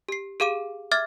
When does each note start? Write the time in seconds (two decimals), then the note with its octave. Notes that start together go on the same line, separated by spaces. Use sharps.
0.09 G4 C7
0.40 G4 G#4 F5 D6 D#7
0.91 E5 D6 F6 G#6 A6